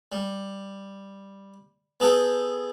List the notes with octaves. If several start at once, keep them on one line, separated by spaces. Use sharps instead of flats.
G3
B3 G#4 A4 F#5 G5